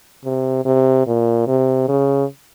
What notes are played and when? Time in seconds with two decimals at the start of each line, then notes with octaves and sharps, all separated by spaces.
0.25 C3
0.65 C3
1.07 A#2
1.47 C3
1.88 C#3